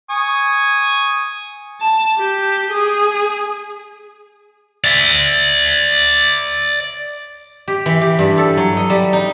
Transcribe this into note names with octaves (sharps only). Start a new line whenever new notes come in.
G#5 C#6 D#6
A5
G4
G#4
D5 E5
G4
E3
G4
G2
A4
F#3
D#5
G3
D#4